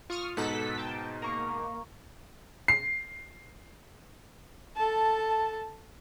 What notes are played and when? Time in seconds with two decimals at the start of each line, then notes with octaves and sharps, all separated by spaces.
0.10 F4 C#6 D#6 F6
0.37 G#2 B2 D#4 A4 F#5 B6
0.77 G5 A5
1.22 A#3 A#5 C#6
2.68 C7
4.76 A4 A5